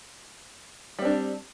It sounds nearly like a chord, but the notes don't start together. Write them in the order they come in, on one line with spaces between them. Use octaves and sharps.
G3 C4 D4